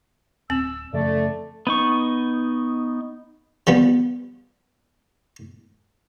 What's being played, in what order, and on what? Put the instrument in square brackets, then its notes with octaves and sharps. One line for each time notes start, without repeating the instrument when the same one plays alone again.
[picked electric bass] D1 [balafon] C4 [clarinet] E6
[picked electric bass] F#2 C#3 F3 [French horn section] A3 [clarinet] D5
[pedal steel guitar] B3 D#4 C#6
[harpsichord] F3 G3 B3